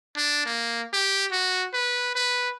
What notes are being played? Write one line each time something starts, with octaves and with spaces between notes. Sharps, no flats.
D4
A#3
G4
F#4
B4
B4